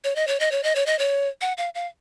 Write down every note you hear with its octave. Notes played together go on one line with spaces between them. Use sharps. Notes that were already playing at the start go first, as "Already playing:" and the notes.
C#5
D#5
C#5
D#5
C#5
D#5
C#5
D#5
C#5
F#5
F5
F5